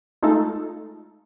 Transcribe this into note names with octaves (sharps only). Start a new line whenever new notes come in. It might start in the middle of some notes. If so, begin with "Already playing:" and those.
G#3 A3 D#4 F4 A4